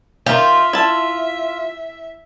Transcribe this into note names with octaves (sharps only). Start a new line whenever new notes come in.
D#3 F4 G4 E5
E4 A5